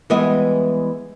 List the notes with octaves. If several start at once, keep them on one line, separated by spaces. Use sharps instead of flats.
E3 G3 G#3 B3 D#5 E5